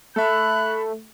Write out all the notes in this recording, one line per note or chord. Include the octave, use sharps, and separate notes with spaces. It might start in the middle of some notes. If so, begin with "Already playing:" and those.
A3 A4 E5 B5 F#6